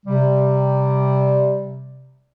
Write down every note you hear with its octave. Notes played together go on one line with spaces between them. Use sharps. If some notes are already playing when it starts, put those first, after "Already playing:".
C3 G3